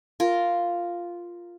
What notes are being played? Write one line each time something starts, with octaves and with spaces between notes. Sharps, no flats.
F4 A#4